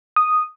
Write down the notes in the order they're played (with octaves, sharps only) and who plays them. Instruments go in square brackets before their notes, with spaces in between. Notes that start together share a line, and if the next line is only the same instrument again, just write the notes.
[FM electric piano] D#6